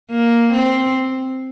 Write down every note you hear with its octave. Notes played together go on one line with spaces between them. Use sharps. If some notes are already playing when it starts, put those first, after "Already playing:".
A#3
C4